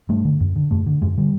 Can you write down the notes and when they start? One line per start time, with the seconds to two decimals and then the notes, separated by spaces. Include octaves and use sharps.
0.09 G2 A3
0.25 D3
0.40 F#2
0.56 D3
0.71 F#2 A3
0.86 D3
1.02 F#2 G#3
1.18 D3 G3